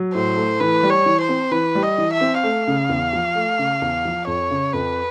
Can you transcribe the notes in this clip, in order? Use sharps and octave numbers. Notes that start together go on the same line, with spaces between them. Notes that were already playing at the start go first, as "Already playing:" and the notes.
Already playing: F#3
A2 C5
A3
E3 B4
G3
C#5
E3
C5
C4
E3 B4
G3
D#5
E3
E5
C4
A3 F5
C#3
E2
F3
A3
C#3
E2
F3
F2 C#5
C#3
F2 B4